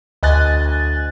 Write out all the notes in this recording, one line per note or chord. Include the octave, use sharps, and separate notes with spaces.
D2 D#5 G#5 F#6 A6